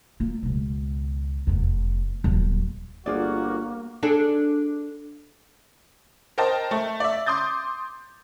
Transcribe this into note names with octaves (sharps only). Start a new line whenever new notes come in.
A#3 F4
C#2 B2
F1 E2
D#1 F#3
G1 A#3 F4 F#4 G#4 D5
D4 G#4 A4
A#4 C5 D#5 G5 A5
A3
D5 E5
C6 D6 D#6 G6 A6